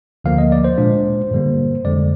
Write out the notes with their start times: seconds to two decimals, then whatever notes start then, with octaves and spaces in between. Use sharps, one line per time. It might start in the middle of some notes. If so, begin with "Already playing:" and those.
0.24 D2 D3 F3 A#3 F5
0.38 D#5
0.52 D5
0.64 C5
0.78 A#2 G#3 D4
1.31 G2 D3 G3 A#3
1.84 F2 D3 G#3 D5